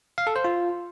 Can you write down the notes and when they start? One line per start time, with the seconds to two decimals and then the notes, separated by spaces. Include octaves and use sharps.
0.18 F5
0.27 A4
0.36 C5
0.44 F4